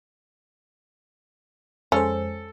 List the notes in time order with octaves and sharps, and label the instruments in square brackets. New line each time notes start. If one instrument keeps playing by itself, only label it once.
[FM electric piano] F2 G#3 C5 [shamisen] C#4 [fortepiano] A4